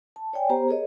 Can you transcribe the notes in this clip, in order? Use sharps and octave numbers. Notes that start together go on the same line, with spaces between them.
A5
C#5 D5 G5 G#5
B3 G4 C5 A#5
G#4 A#4 C#5 D#5